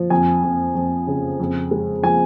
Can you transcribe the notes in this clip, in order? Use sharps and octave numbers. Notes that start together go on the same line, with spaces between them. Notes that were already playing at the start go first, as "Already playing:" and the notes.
Already playing: F3
F2 G#5
F2
F2
C#3
F2
G#3
F3 G#5